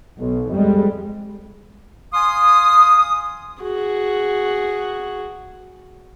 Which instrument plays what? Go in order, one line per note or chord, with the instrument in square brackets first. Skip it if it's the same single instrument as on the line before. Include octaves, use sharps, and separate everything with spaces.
[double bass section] B1
F2 G3 G#3
[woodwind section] F5 G#5 C6 D#6
[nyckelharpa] F#4 G#4